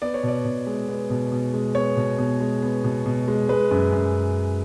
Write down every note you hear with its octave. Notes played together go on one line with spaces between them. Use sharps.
B3 D5
C#5
B2 D5
B2
G#3
B3
B2
B2
G#3
B3 C#5
B2
B2
G#3
B3
B2
B2
G#3
G#3 B4
F#2
F#2